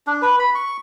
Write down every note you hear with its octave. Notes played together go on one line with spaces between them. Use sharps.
D4
B4
B5
C#6